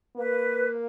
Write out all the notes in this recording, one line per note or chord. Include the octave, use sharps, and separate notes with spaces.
A#3 B4